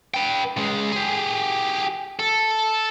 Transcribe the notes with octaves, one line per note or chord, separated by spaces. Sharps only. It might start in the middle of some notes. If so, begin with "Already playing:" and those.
B4 G5
C#2 G#3
G4 G#4
A4